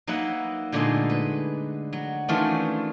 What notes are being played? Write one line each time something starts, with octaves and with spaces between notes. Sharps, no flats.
F#3 A#3 D#4 B4 E5 F#5
A#2 D3 G#3 A3 D#4 G#4
B4
F#3
D#3 E3 A3 C#4 D4 F4